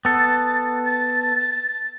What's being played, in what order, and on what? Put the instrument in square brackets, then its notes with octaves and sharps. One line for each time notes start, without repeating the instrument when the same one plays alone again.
[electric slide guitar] B3 A4 [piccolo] A6
[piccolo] A6